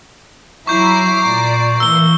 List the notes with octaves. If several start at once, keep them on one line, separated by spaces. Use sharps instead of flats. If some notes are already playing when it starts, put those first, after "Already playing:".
F#3 E4 A#5 C#6 D6 G6 C7
A#2 D5
E3 A#3 E6 G7